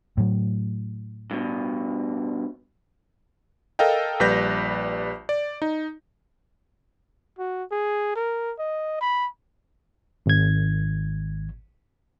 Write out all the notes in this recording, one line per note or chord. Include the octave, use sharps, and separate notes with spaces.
A2 F#3
G2 B2
A4 A#4 D#5 F5 G5
A#1 G3 B4 G6 A#6
D5
D#4
F#4
G#4
A#4
D#5
B5
G#1 G#6